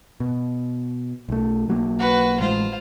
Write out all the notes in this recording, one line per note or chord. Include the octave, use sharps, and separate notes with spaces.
B2
B1 A3
B1 F#3 A#3
F#4 B4
A1 G#3 F4 C5